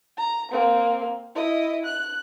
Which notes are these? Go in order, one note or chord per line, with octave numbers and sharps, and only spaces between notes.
A#5
A#3 C4
E4 D#5
F#6